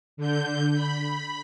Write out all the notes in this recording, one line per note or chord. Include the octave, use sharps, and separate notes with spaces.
D3 G6
B5